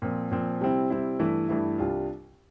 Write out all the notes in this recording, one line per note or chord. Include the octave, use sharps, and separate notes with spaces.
A#2 F3 C4
A#2 F3 C4
C3 G3 C4 E4
C3 G3 C4 E4
G2 E3 A3 E4
G2 E3 A3 E4
C2 C3 G3 D4 F4